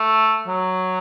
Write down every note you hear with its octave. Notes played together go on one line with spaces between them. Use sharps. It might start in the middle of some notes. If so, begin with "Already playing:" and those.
Already playing: A3
F#3